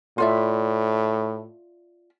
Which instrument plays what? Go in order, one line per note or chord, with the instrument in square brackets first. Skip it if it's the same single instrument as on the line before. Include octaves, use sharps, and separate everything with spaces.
[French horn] A2 [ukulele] F4 D5 E5